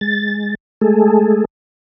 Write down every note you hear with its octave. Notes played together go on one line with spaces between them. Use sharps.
G#3 A6
G#3 A3 G#4 A4